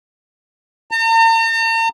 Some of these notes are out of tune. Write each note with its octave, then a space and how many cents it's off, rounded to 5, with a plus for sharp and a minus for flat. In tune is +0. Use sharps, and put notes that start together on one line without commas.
A#5 -45